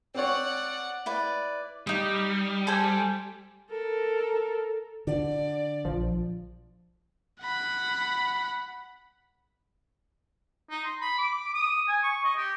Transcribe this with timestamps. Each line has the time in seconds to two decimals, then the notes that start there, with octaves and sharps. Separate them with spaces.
0.15 C4 C#5 D5 F#5
1.06 E4 B4 D5
1.87 G3 D#4 D#6
2.67 A4 C5 G#5
3.70 A4 A#4
5.07 D3 D5
5.85 A#1 F3
7.41 F#5 B5
10.70 D#4
10.85 C6
11.01 B5
11.19 D6
11.54 D#6
11.88 G#5
12.03 C#6
12.24 D#5
12.36 G4